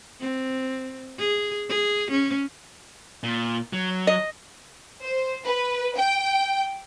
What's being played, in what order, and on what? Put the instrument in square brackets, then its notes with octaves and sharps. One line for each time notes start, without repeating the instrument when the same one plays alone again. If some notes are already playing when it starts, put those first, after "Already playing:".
[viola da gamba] C4
G#4
G#4
C#4
[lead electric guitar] A#2
F#3
[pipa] D#5
[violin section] C5
B4
G5